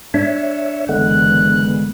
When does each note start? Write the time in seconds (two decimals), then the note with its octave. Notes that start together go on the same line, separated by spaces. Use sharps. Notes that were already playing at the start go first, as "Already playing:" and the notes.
0.14 D4 C#5 E5
0.89 F#1 D3 E3 G#3 B3 F#6